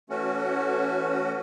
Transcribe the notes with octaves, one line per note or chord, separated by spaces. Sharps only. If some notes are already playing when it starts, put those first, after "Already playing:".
E3 A3 C#4 F#4